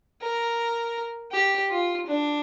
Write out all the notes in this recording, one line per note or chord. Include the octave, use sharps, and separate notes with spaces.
A#4
G4
F4
D4